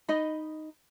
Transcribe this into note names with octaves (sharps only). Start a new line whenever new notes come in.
D#4 D#5 B5